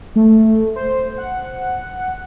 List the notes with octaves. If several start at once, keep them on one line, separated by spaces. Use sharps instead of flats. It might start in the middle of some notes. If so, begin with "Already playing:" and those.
A3
C5
F#5